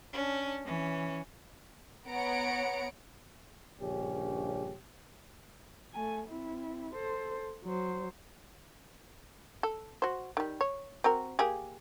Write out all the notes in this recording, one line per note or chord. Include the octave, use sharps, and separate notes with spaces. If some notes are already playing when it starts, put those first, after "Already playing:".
C#4 D4
E3 C#4
B3 C#5 F#5 A#5 C#7 D7
A#1 G2 C#3 C#4 G4
A3 G#5
C4 E4
A4 C5
F#3 C5
A4
F#4 C5
D#3 G3
C#5
C4 F#4 A#4
A#3 G4 G#4